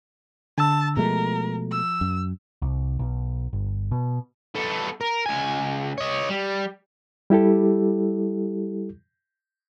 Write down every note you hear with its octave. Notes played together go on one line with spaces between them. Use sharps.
D3 A5 E6
B2 F3 G#3 A3 A#4
E6
F#2
C2
B1
G1
B2
B3 A4
A#4
C#2 G#5
C#5 D#5
G3
G3 E4 G4 A4